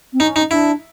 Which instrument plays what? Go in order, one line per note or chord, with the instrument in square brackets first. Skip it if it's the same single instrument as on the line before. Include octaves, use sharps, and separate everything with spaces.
[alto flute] C4
[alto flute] C#4 [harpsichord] D#4
[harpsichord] D#4
[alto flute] D4 [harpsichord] E4